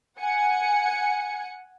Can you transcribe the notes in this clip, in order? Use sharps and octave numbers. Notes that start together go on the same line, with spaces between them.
F#5 G#5 C#7